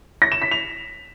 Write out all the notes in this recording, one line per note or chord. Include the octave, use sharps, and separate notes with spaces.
A#6
E7
B6
F7